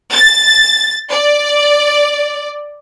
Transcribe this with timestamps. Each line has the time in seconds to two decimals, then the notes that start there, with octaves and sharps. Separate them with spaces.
0.12 A6
1.11 D5